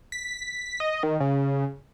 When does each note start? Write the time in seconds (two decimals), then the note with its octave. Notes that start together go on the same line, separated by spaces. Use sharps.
0.12 B6
0.80 D#5
1.03 D#3
1.20 C#3